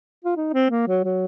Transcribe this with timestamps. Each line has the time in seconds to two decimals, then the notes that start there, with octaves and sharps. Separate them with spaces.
0.24 F4
0.37 D#4
0.53 C4
0.70 A#3
0.88 F#3
1.04 F#3